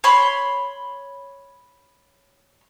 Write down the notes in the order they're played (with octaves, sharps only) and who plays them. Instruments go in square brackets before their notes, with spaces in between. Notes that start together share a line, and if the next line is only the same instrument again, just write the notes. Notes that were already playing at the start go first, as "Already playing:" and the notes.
[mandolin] C#5 B5 C6